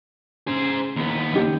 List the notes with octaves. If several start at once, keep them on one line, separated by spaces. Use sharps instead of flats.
C#3 G#4 C5
D#2 B3
F#1 D#3 G4